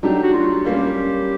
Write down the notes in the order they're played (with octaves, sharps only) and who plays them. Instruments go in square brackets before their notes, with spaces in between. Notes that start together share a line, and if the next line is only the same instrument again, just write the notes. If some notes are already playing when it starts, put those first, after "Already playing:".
[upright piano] F#3 A3 D4 G4 [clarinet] D#4
[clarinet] F#4
F4
[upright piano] G3 A#3 C#4 [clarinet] G4